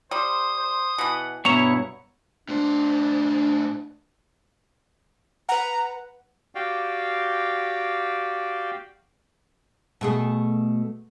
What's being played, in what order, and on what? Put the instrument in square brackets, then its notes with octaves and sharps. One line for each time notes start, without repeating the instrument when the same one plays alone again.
[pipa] G3 [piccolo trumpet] C5 [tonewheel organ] D#6
[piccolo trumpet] C5
[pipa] B2 E3 [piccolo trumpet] F#5
[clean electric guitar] G2 B2 A#5 [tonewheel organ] B3 C#5 [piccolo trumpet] E4 [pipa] C#6
[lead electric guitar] A2 C5 [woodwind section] D4
[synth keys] B4 F#5 [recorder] A#5
[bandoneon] F#4 G4 D5 F5 G5
[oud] B2 A3 G#4